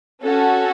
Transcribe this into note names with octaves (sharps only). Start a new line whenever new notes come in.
C#4 F#4 A4